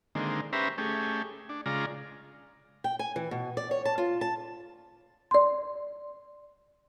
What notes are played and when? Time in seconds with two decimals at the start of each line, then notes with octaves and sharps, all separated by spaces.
0.15 D3 D#3 G#3 A#3 C4
0.53 C#4 G4 B4 C5 E5 A#5
0.78 A3 C#4 G4 G#4
1.49 D4
1.66 C#3 G#3 F4 D5 A#5
2.84 G5
2.99 G#5
3.16 E3
3.31 B2
3.57 D5
3.71 C#5
3.85 A5
3.98 F4
4.21 A5
5.31 D5 C6